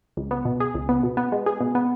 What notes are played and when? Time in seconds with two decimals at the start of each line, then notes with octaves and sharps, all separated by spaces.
0.17 C#2
0.31 B3
0.45 B2
0.60 G#4
0.75 C#2
0.89 B3
1.03 B2
1.17 B3
1.32 G#3
1.46 G#4
1.61 B2
1.75 B3